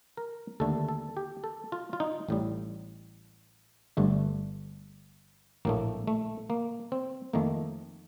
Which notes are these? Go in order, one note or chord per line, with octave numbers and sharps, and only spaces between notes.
A#4
D#2 D3 A3 A4
A4
G4
A4
F4
F4
D#4
A1 A2 G3
G1 G2 D3 A3
A#1 A2 A3 A#3
A3
A#3
C4
F2 D#3 A3 A#3